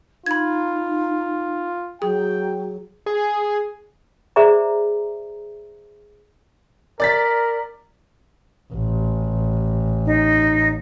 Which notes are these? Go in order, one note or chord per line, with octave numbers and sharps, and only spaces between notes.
D#4 F4 B5 G#6
F#3 G#4 G5
G#4
G#4 C5 D5 E5 A#5
A#4 D5 A6 B6
A1
D#4